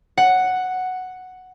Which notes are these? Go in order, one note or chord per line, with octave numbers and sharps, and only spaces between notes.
F#5